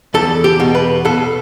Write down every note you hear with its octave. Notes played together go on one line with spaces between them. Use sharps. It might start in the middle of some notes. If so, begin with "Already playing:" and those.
E2 A4
G4
B2
B4
B2 A4